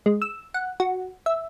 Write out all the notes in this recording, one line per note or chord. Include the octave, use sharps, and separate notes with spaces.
G#3
E6
F#5
F#4
E5